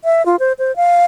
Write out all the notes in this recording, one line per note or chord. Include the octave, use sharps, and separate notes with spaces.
E5
F4
C5
C5
F5